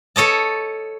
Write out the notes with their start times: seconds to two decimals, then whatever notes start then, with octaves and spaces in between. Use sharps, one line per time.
0.16 A4 C#5 D#5 A5